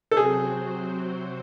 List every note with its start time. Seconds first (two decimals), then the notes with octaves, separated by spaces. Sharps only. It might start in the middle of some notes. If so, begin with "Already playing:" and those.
0.11 A4
0.16 C3 F#3 C4 F#4 G#4 C5